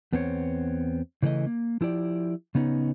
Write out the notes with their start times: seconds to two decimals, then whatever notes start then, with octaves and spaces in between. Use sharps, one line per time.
0.12 E2 B3 C4 D4 C#5
1.22 C#3 E3 A3 D5 D#5
1.46 A#3
1.81 F3 E4 G4 D5
2.55 C#3 B3 C#4 D#4